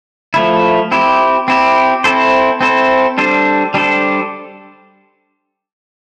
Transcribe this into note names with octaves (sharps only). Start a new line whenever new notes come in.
F3 A3 E4
C4 E4 G4
C4 E4 G4
C4 E4 A4 C5
C4 E4 A4 C5
G3 D4 A4 C5
G3 D4 A4 C5